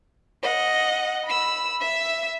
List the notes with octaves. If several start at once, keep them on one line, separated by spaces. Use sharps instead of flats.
D#5 F#5
B5 E6
E5 E6